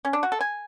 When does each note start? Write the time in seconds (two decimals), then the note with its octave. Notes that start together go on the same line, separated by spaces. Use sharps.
0.05 C#4
0.13 D4
0.23 F#4
0.32 A4
0.41 G#5